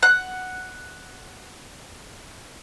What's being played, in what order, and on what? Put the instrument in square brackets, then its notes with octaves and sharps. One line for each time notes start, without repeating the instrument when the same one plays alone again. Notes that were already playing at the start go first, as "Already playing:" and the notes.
[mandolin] F#5 F#6